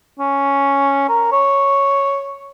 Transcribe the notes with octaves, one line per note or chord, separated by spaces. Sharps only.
C#4
A#4
C#5